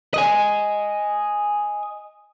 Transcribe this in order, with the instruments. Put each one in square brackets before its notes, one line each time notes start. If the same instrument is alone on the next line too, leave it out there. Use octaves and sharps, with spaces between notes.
[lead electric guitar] D#5 G#5